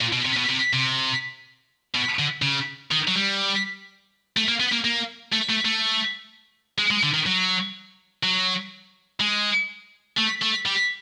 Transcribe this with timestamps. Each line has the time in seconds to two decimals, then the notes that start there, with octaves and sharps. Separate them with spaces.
0.01 A#2
0.12 B2
0.25 C3
0.36 B2
0.49 C3
0.73 C3
1.95 B2
2.19 D3
2.42 C#3
2.91 D#3
3.08 F#3
3.15 G3
4.37 A3
4.48 A#3
4.60 B3
4.72 A#3
4.85 A#3
5.33 A3
5.50 A3
5.65 A3
6.78 G#3
6.91 G#3
7.03 D3
7.14 D#3
7.27 F#3
8.23 F#3
9.20 G#3
10.17 A3
10.42 A3
10.66 G3